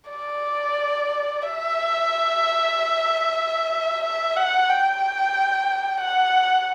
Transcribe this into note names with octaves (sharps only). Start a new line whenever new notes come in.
D5
E5
E5
F#5
G5
F#5